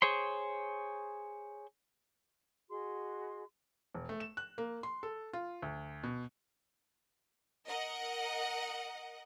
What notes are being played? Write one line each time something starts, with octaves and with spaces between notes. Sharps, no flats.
G#4 C5 C#5 C6
F#4 G#4 D#5 C6
E1
A3
E7
F#6
A#3
C6
A4
F4
D2
B2
A#4 D#5 F#5